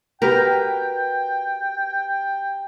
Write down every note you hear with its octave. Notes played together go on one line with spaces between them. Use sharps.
F#4 G4 A#4 B4 G5